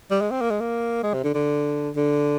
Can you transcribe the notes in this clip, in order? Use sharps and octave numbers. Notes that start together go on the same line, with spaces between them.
G3
G#3
C4
A#3
G#3
A#3
G#3
C3
D3
D3
D3